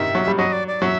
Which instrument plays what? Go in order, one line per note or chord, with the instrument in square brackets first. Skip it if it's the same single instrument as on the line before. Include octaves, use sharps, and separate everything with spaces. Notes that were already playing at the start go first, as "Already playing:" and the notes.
Already playing: [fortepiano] C3 D#3 [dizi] E5
[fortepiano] F#3
G3
[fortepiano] F#3 [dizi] D#5
[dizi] D5
D5
[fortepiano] F#3 [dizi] E5